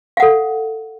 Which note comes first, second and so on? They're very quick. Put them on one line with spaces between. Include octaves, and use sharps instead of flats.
F5 F#5 A4